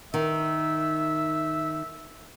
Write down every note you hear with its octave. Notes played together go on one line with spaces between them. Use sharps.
D#3 E5